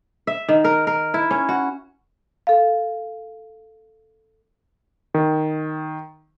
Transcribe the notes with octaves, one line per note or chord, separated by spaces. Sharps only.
E5
D#3
A#4
A#4
E4
C#4
F#4
A4 F5
D#3